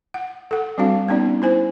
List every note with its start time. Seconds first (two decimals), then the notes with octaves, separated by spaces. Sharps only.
0.14 F#5
0.51 A4 F#5
0.78 G3 C4 D4 F#4 F5
1.08 B3 C#4 D#4 D5
1.42 E4 C5 G#5